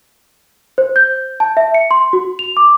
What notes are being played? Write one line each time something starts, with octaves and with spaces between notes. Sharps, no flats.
C5
G6
A5
E5
C#7
C6
F#4
F7
D6